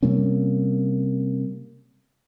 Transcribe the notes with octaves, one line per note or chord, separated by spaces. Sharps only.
C3 G3 A#3 C#4